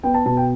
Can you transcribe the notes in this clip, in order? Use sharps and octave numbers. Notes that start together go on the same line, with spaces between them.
B3 G5
A5
B2 A5
G5